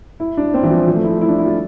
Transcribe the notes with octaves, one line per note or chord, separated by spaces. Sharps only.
E4
D4
C4
E3
F3
F3
A3
E4
E4
D4
E4
F4